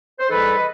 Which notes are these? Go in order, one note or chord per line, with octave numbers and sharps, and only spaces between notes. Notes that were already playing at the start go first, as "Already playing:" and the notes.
C5
G#2 E3 G3 A4 B4
D#5